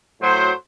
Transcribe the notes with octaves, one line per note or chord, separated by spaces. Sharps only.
A2 F#3 C5